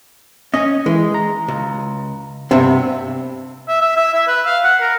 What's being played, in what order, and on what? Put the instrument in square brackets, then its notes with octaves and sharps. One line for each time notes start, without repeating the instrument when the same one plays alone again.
[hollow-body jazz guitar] C#4 [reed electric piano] D#5
[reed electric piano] E3 [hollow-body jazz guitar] G#3
[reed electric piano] A#5
[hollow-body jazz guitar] C#2
[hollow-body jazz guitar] G2 C3 B3 [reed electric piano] C4 E5
[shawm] E5
E5
E5
E5
B4
F5
F#5
A#4